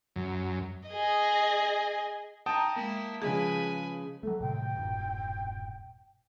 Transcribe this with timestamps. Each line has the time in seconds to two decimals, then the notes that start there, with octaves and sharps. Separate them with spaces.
0.16 F#2
0.89 G#4 D#5
2.46 D#4 G5 A5 D#6
2.76 G#3 A#3 E4
3.22 C#3 F3 G#3 G#4 B4 G#5
4.23 F#3 A3 A4
4.40 A2 C3 D#3 G5
4.76 E1 G2 A#2